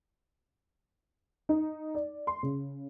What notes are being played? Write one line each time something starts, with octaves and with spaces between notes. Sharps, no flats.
D#4
D5
C6
C#3